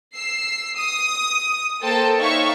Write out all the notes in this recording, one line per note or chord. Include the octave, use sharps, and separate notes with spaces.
E6 C7
D#6
A#3 A4 C5 G5 A5
D#4 C#5 E5 F5 C#6